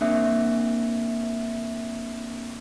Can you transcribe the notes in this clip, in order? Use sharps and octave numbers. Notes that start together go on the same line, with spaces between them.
A#3 C4 D4 E5